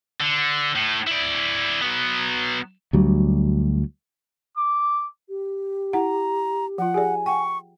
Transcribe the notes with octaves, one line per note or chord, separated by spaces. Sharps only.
D3
A2
E4 D5
F#3 B3
D2 F#3 G3
D6
G4
E4 F#5 A#5
F3 F4 F#5
G4 G#4 D5 G#5
F#5 G5 C#6